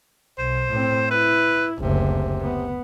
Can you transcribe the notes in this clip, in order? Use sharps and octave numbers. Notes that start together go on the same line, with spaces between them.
B1 C5
A2 C4
E4 B4
F#1 D2 C3
B3